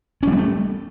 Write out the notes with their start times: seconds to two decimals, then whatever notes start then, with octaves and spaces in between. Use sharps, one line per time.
0.23 C#4
0.28 G3
0.32 B3
0.37 A3